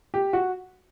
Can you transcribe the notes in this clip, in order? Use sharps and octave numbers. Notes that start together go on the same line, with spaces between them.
G4
F#4